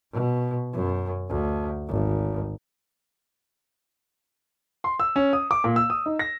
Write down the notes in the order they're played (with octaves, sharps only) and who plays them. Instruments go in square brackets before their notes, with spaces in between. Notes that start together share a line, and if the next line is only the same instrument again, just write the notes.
[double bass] B2
F#2
D2
G#1
[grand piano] C6
E6
C#4
D#6
D6
A#2
E6
D#6
D#4
A#6